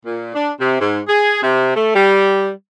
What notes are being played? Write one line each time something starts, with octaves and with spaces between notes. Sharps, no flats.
A#2
D4
C3
G#2
G#4
C3
A3
G3